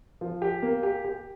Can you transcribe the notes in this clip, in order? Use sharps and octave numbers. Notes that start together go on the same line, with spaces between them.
F3
G4
A#3
G4
G4